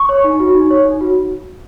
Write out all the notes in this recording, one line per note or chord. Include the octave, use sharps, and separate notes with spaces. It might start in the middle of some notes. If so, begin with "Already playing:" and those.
Already playing: C#6
C#5
D#4
F#4
D#4
C#5
D#4
F#4